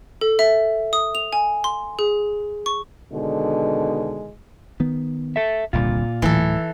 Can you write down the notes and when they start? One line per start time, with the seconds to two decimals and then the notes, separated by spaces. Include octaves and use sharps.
0.21 A4
0.39 E5
0.93 D#6
1.15 F7
1.33 G#5
1.64 C6
1.99 G#4
2.66 C#6
3.12 B2 D3 D#3 G#3
4.80 D#3 B3
5.36 A4 E5
5.73 D#1 C2 A#2 D3 F4
6.22 D1 A2 E3 F#3 A4